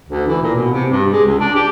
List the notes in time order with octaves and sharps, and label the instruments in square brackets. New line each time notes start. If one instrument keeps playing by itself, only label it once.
[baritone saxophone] D2
E3
A#2
B2
C3
G2
G#3
C#2
D4
G4